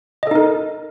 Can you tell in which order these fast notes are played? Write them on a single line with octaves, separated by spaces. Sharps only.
D#5 A4 D#4 A#4